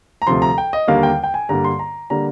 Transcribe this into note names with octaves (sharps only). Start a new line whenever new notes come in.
A#5
D2 C3 F3 C6
A#5
G5
D#5
D#2 D3 G3 A#3 F5
G5
G5
G#5
G2 D3 G3 A#3 A#5
C6
A#5
D3 G3 A#3 A#5